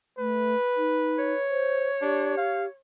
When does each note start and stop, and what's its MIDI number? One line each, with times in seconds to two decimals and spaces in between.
0.18 0.55 57
0.18 1.50 71
0.77 1.33 63
1.18 2.79 73
1.50 1.90 72
2.02 2.36 62
2.02 2.67 67
2.37 2.65 77